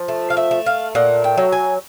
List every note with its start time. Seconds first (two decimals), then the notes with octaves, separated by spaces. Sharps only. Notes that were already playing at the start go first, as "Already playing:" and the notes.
Already playing: F3
0.08 A3
0.30 F5
0.37 E5
0.51 A3
0.66 F5
0.95 A#2 F#5
1.24 G5
1.38 F#3
1.52 G#5